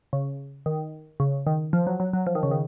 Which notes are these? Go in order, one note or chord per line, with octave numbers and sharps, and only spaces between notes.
C#3
D#3
C#3
D#3
F3
F#3
F#3
F#3
F3
D#3
C#3
D#3